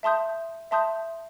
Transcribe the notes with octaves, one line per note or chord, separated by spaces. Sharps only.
E5 A5 C6 D#6 G6
E5 A5 C6 D#6 G6